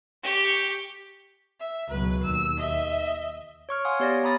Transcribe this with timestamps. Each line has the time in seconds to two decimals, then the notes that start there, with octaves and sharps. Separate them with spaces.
0.23 G4 C#6
1.60 E5
1.90 C#2 B2 F#3 B4
2.23 D#2 E6
2.57 D#5 E5
3.69 C#5 C#6 F6
3.85 F5 F#5 G#5 C6 D#6
4.00 B3 G4 C#5 D5 A#6
4.23 B3 A#5 B5 D#6 A6